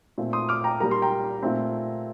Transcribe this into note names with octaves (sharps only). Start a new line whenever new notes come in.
A#2 A3 C4
C6 D#6
D6 F6
G5 A#5
A#2 G3 A#3 A#5
C6
G5 A#5
A#2 A3 C4